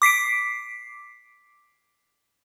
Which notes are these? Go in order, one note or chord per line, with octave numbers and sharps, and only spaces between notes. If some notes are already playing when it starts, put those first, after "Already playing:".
D6 B6 C7 D7